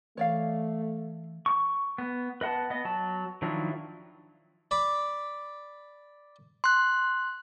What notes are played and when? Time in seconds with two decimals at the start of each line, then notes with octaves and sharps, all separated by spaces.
0.17 E3 A3 C#5 D5 F5
1.46 C#6
1.98 B3
2.41 B4 D#5 F#5 A5
2.70 B3 D#5
2.85 F#3 A5
3.42 D#3 F3 F#3 D4 E4
4.71 D5 B5 D6
6.64 C6 F#6